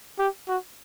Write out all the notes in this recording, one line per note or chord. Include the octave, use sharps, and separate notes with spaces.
G4
F#4